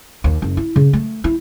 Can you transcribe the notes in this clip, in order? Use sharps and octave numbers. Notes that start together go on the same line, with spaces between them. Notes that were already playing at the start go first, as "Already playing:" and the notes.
D#2
F#1
E4
C#3
A3
E4